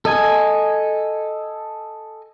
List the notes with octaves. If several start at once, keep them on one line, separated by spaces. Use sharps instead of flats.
A4 D#5 G#5